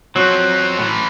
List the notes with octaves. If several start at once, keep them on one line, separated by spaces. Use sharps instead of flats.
F3 F#3 C4
A2 E3